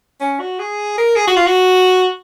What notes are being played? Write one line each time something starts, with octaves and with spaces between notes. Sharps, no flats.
C#4
F#4
G#4
A#4
G#4
F#4
F4
F#4